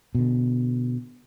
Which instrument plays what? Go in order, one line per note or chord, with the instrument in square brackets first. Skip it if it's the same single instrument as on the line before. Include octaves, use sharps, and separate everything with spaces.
[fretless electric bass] B2 D3